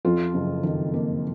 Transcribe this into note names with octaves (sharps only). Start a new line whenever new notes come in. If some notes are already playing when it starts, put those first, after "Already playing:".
F2 F4
F#1
D#3
A#3